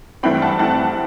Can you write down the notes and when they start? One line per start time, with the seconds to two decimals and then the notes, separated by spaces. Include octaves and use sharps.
0.23 G2 E3 A3 C4 G5 B5
0.42 F#5 A5
0.59 G2 E3 A3 C4 F#5 A5